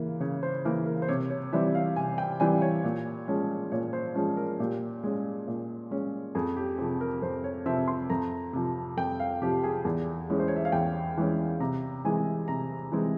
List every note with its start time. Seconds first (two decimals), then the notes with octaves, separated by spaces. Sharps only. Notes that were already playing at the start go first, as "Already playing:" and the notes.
Already playing: C#3 E3 A#3
0.20 C#3 C#5
0.43 C5
0.65 E3 A#3 A#4
0.86 A#4
1.02 C5
1.08 C3 C#5
1.30 C#5
1.53 E3 G3 C4 E5
1.75 F5
1.96 C3 G#5
2.18 G5
2.40 E3 G3 C4 G#5
2.62 C#5
2.84 A#2
3.28 F3 G#3 C#4
3.72 A#2 C#5
3.93 C5
4.15 F3 G#3 C#4
4.37 A#4
4.60 A#2 G4
5.03 G#3 C#4
5.48 A#2
5.91 G#3 C#4
6.35 F2 G#4
6.57 G4
6.78 C3 F3 C4 G#4
7.01 A#4
7.22 F2 C5
7.44 C#5
7.66 C3 F3 C4 E5
7.88 C6
8.10 F2 A#5
8.53 C3 F3
8.97 F2 G5
9.20 F5
9.42 C3 F3 G4
9.64 G#4
9.85 E2
10.30 E3 G#3 C#4
10.39 C5
10.48 C#5
10.56 E5
10.65 F5
10.72 E2 G5
11.17 E3 G#3 C#4
11.60 C3 A#5
12.04 E3 G#3 C4 G#5
12.48 C3 A#5
12.92 E3 G#3 C4